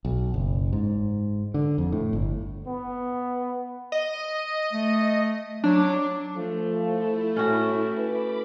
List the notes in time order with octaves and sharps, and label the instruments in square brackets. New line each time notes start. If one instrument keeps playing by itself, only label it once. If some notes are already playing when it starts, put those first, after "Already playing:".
[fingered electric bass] B1
F#1
G#2
D3
F2
A2
G1
[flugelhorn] B3
[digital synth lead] D#5
[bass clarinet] A3
[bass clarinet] F#3 [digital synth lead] D4
[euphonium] F3 [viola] A3
[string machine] E4
[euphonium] A2 [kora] C#4 F#4
[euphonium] B4 [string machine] B5 D6